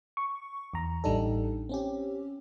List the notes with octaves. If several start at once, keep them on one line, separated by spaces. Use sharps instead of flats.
C#6
E2 A#5
A1 G3 D4 D#4 A4
C4 C#4 G4